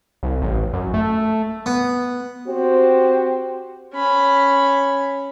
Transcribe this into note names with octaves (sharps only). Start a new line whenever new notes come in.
C2
A1
F#2
A3
B3
C4 F#4 G4 C5
C#4 B5